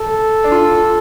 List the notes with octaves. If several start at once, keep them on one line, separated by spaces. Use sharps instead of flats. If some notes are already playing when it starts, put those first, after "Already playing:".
Already playing: A4
D4
F4